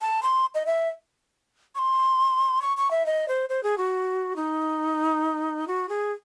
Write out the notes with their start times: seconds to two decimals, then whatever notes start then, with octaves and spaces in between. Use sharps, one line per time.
0.01 A5
0.23 C6
0.55 D#5
0.66 E5
1.75 C#6
1.79 C6
2.62 C#6
2.77 C#6
2.91 E5
3.06 D#5
3.28 C5
3.49 C5
3.63 G#4
3.78 F#4
4.36 D#4
5.68 F#4
5.89 G#4